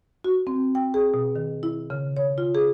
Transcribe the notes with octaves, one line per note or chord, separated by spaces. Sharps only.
F#4
C4
G5
G#4
B2
D#3
E4
C#3
C#5
F4
G#4